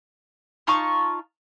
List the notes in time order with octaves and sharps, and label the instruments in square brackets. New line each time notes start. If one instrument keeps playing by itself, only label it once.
[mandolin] D#4 F4 A5 C#6